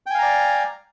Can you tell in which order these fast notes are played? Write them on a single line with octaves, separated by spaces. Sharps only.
G5 G#5 F5 A#5 D5